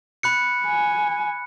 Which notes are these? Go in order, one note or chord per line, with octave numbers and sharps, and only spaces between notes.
B5 F#6 C#7
G#5